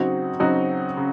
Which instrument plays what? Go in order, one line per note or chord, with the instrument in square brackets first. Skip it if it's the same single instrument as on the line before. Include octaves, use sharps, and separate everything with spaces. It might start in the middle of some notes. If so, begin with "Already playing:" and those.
Already playing: [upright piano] C#3 F#3 C4 D#4 F#4
C#3 F#3 C4 D#4 F#4
C#3